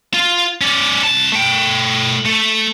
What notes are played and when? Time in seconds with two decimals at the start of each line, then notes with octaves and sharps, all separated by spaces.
0.14 F4
0.61 C#4 D5
1.04 C2 A5
1.32 A3 G5
2.25 A3